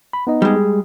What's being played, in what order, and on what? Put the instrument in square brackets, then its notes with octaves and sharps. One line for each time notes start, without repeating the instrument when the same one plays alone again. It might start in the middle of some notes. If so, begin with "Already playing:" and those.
[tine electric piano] B5
B3 D#4 D#5
[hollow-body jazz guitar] G3 G#3
[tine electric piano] G#4